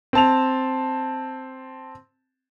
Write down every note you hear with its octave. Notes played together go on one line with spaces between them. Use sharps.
C4 A5 F7